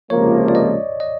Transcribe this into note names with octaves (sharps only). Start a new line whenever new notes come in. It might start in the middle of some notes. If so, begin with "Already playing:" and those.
C#2 C3 F3 A#3 C#5
D5
D#5
D#5